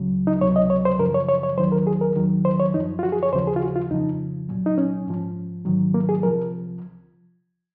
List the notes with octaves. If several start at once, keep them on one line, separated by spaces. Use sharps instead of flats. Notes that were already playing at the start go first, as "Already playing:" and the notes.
Already playing: C#2 C#3 F#3
D#4
C#2 C3 F#3 C#5
D#5
C#5
C5
F#2 C#3 F3 A#4
C#5
C#5
C#5
D#2 D#3 F#3 C5
A#4
G#4
A#4
D#2 D#3 F#3
C5
C#5
F#2 F3 D#4
F4
F#4
G#4
C#5
D#2 C#3 F3 C5
G#4
F4
F#4
F4
F2 C#3 F3 D#4
C2 A#2 F#3
D#4
C#4
G#2 F3
G#2 D#3 F#3
A#3
G#4
C2 C3 F3 A#4